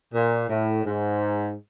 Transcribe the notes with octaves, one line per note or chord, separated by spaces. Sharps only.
A#2
A2
G#2